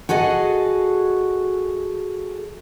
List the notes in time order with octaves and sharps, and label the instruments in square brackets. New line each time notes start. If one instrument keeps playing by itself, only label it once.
[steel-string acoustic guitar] F#4 G#4 A4 D#5